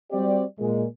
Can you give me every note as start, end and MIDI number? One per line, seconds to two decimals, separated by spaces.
0.12 0.42 55
0.12 0.42 60
0.12 0.42 66
0.12 0.42 67
0.12 0.42 74
0.59 0.85 46
0.59 0.85 56